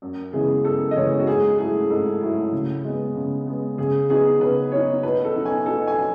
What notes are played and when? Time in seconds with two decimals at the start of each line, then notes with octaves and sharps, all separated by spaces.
0.02 F#2
0.33 C#3 E3 G#3 B3 G#4
0.64 F#2 A4
0.91 D#5
0.95 C#3 E3 G#3 B3 C#5
1.19 F#4
1.27 G#2 G#4
1.58 F#3 A3 E4 G#4
1.90 G#2 A4
2.21 F#3 A3 E4
2.52 C#3
2.84 G#3 B3
3.16 C#3
3.46 G#3 B3
3.78 C#3 G#4
4.09 F#3 B3 D#4 G#4
4.40 C#3 B4
4.72 F#3 B3 D#4 C#5
5.03 B2 B4
5.25 A4
5.35 F#3 B3 D#4
5.45 G#5
5.66 B2 A4
5.87 G#5
5.98 F#3